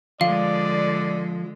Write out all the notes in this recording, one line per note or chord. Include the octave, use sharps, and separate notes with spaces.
D3 F3 G#3 D5 F5